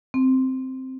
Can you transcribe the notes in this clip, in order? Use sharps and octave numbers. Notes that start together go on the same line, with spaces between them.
C4